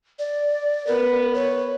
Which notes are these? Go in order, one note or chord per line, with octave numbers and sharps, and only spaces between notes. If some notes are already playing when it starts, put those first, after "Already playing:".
D5
B3 A#4 B4
C#5